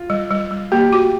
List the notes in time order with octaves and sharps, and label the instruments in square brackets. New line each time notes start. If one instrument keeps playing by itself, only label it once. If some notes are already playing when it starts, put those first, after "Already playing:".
Already playing: [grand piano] F4
[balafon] G3
G3
G3
[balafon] A#3 [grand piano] G4
[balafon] F#4